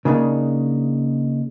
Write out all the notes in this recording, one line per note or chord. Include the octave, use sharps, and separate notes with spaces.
C#3 A#3 D4 D#4